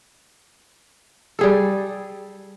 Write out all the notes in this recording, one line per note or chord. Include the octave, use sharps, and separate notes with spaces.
G3 G#4 A4